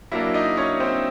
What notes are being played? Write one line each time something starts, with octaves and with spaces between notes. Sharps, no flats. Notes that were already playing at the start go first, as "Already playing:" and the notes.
F#3 A#3 D4 E4 E5
D#4 D#5
C#4 C#5
C4 C5